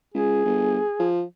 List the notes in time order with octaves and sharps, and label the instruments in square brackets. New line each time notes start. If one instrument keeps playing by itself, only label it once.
[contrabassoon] C#2 [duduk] G#4
[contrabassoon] G1
F3